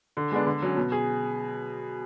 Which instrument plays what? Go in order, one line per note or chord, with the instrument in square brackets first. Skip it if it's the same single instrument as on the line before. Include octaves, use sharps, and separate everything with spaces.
[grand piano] D3
G#3 B3 D4
D3
F#3 C#4
B2
G#4